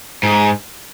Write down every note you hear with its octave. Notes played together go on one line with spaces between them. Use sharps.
G#2